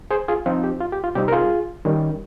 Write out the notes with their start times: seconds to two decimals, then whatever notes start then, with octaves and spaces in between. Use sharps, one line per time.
0.11 G#4 C5
0.28 F4 G#4
0.46 F3 C4 D#4 F4
0.64 G4
0.81 F4
0.92 G4
1.04 F4
1.15 C3 G3 C4 D#4 G4
1.28 A#4
1.32 F4 G#4
1.85 D#3 G3 C#4